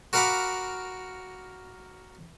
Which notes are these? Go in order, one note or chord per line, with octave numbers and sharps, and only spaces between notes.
F#4 A#4 F5 F#5 B5 D6